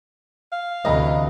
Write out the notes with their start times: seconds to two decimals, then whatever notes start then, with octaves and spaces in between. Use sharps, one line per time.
0.52 F5
0.85 D2 C3 E3 A3 D#5 A#5 B5